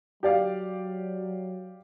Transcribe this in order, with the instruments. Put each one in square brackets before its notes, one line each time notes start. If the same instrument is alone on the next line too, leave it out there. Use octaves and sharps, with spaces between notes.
[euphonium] F#3 [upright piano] G4 D5 F5